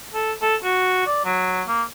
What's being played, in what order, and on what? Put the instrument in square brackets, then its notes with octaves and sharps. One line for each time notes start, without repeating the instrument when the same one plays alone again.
[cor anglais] A4
A4
F#4
D5
F#3
A#3